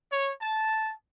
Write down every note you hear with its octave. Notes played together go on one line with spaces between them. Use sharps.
C#5
A5